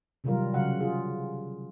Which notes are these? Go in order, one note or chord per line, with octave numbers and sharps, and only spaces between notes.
C3 D#3 F#3 G3 F4 A#4
C#3 F#3 F#4 F5 F#5
F4 G#4